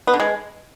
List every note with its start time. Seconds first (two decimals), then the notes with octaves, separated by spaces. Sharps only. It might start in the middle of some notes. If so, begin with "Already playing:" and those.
0.07 B3
0.14 D3
0.20 G#3